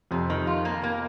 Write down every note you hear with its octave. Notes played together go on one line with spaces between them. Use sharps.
F2 C3
D#3
F4
A#3
A#3